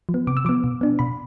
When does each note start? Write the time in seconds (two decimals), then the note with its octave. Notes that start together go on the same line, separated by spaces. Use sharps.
0.09 F3
0.14 B3
0.27 C3 D6
0.37 E6
0.45 F3 B3 D6
0.64 B2
0.81 B3 D4
0.99 B2 B5